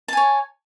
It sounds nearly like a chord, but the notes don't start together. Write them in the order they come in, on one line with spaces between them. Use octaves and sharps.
A5 G#5 C#5